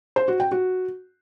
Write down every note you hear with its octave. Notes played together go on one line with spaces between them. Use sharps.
C5
F#4
G5
F#4